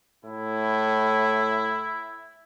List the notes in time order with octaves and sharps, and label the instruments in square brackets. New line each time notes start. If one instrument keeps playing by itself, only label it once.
[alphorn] A2 [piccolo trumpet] E4